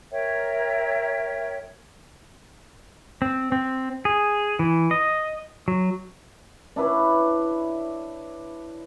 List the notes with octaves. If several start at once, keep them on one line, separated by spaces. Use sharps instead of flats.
A#4 C#5 E5 G5
C4
C4
G#4
E3
D#5
F#3
D4 E4 B4 C#5